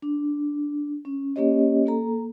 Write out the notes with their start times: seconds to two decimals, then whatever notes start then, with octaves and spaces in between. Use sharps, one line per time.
0.02 D4
1.05 C#4
1.36 A#3 C#4 G4 C#5 D#5
1.86 A#3 A4 A#5